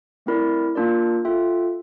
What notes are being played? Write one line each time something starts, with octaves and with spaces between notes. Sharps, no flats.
A3 C4 E4 A#4 D5
A#3 D4 F4 A#4 D5
F4 A4 E5 G5